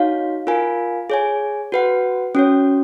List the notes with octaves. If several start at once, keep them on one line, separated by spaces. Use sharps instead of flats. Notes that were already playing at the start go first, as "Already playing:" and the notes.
Already playing: D#4 F#4 C#5 F5
F4 A#4 F5 G#5
G#4 C#5 G#5
F#4 B4 F#5
C#4 F#4 C#5